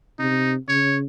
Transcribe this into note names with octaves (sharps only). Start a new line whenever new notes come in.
C3 D#4
C#3 C#5